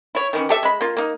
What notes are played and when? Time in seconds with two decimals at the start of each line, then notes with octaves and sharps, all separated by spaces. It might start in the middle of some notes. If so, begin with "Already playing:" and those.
0.15 E4 C#5
0.33 D#3 E3 C#4
0.49 G4 A4 E5
0.63 G#3 B5
0.81 A#3 F4
0.97 A#3 D#4